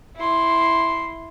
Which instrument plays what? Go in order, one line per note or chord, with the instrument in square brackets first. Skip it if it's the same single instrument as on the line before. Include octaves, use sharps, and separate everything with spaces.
[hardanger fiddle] E4 C6